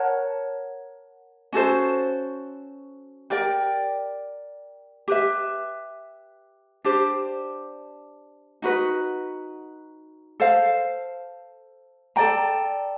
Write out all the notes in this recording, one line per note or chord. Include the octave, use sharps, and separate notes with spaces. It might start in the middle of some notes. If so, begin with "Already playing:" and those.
Already playing: A#4 C#5 F#5 A5
C#4 F#4 A4 C5
G4 A#4 D5 G5
G4 B4 E5
D4 G4 C5
D#4 F#4 B4
A4 C5 F5
A4 D5 G5 A#5